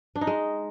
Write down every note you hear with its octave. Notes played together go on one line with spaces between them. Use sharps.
D4
D#4
G#3